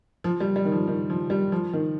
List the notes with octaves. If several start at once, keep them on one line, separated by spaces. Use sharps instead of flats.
F3
G3
G3
D#3
F3
D#3
F3
G3
F3
D#3